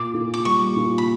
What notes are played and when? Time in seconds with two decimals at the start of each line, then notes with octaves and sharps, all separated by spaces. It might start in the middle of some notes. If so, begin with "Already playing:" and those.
Already playing: A#2 D6
0.14 A#2
0.34 D6
0.45 G3 C#6
0.77 A#2
0.98 B5